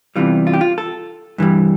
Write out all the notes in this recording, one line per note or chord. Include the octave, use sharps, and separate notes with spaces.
E2 C3 E3 G3 F4
F4
G4
F4
A4
G2 E3 G3